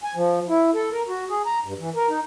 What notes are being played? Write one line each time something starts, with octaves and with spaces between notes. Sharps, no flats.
G#5
F3
E4
A4
A#4
F#4
G#4
A#5
G2
E3
A#4
D#4